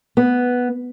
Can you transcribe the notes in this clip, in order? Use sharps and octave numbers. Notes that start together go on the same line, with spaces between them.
B3